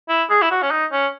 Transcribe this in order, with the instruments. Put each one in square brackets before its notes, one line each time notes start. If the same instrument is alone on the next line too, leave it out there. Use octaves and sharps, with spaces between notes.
[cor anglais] E4
G#4
E4
F#4
C#4
D#4
C#4